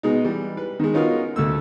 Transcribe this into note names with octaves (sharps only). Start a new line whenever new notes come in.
B2 G#3 D#4
E3 G3
B4
D#3 G#3
B3 C#4 D#4 F4 F#4 A#4
D2 A3 E6